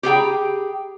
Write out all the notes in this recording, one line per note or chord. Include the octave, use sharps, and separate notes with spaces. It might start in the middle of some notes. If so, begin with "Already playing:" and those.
G4 G#4 G5 A#5